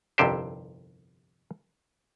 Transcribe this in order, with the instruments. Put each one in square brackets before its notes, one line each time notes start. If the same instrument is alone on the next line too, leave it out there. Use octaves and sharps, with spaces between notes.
[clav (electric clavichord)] G1 C2 F2 C3 G4 C5